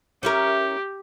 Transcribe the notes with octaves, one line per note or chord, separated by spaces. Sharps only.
C#4 E4 G4 A#4